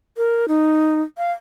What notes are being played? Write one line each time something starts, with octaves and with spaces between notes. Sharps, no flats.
A#4
D#4
F5